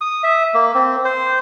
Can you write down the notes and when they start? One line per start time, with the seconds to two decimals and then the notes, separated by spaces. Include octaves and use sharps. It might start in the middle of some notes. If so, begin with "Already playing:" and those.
0.01 D#6
0.23 E5
0.54 A#3
0.75 C4
1.05 C5